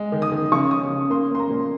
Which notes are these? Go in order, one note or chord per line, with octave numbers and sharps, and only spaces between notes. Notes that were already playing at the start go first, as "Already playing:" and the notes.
Already playing: G#3
D#3
D#6
D#3
C#3 C#6
C#4 D#6
C#3
A#3 C6
A#3 C6
A#5
A#2